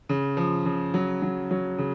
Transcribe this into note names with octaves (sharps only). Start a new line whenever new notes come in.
C#3
F3
C#3
F#3
F#3
F#3
C#3